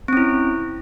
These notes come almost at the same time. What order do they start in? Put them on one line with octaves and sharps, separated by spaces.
C4 C#4 E4